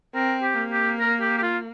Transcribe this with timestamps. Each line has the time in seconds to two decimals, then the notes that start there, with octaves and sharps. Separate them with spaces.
0.15 C4 A#4
0.42 G4
0.58 A#3
0.72 G4
1.00 A#4
1.21 G4
1.38 G4
1.43 F4